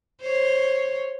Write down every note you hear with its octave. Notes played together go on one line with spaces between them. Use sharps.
C5 C#5